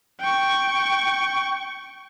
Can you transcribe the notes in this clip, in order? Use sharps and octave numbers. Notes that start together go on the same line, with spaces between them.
G5 C#6